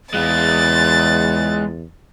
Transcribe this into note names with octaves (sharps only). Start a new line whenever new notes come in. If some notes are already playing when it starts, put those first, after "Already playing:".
E2 G#3 F4 F#6 A6